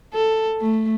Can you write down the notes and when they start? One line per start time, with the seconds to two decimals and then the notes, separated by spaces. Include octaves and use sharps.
0.14 A4
0.61 A3